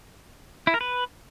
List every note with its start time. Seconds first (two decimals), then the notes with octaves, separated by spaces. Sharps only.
0.67 E4
0.74 A#4
0.81 B4